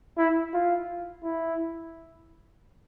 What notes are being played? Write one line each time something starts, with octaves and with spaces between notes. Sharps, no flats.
E4
F4
E4